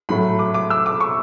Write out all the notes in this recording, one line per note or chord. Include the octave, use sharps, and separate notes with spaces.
A2 F#3 A3 B5
D6
D6
E6
D6
C#6